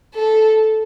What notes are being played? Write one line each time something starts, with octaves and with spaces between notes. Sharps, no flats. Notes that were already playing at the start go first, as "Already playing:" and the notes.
A4